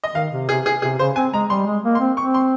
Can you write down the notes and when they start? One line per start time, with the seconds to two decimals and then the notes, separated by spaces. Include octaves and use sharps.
0.04 D#5
0.15 D#3 F5
0.32 C3
0.49 C3 G#4
0.66 G#4
0.82 C3 G#4
0.99 C#3 C5
1.16 C4 G#5
1.33 G#3 A#5
1.50 G3 C6
1.66 G#3
1.84 A#3
1.95 C6
2.00 C4
2.17 C4 C#6
2.34 C6